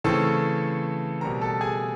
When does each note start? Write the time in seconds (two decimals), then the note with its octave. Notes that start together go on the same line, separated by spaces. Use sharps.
0.04 C#3 E3 A3 C4 A4 A5
1.21 B2 G3 C4 A#4 A#5
1.41 A4 A5
1.61 G#4 G#5